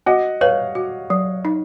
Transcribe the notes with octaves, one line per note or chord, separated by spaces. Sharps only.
F#4 D#5 F#5
B4 C#5 F5
F#4
F#3
D#4